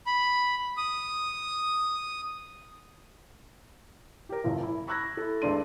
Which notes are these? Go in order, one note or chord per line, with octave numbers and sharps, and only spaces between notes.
B5
D#6
G4 A#4
F#1 C#2 F#2
E4
B5 C#6 E6 F#6 G#6 A#6
E4 A4
D2 G2 G#3 D4 C6 D#7